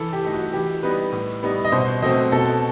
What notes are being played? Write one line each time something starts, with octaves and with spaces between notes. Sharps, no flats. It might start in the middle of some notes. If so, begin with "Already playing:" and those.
Already playing: E3 A4
G4
A3 D#4
F#4
E3 G4
G3 B3 D#4 B4
A2
G3 B3 D#4
D#5
B2 C5
F#3 A3 C4 D#5
B2 A4